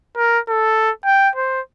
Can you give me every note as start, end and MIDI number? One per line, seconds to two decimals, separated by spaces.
0.17 0.39 70
0.48 0.90 69
1.05 1.29 79
1.36 1.60 72